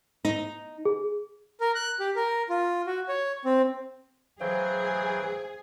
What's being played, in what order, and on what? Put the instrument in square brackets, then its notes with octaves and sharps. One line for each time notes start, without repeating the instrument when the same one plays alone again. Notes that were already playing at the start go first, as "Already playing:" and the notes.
[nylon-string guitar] D#4
[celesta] G#4
[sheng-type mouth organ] A#4
F#6
G4
A#4
F4
F#4
C#5
C4
[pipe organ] E3 F#3 G5 [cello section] G#4 [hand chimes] C5 F5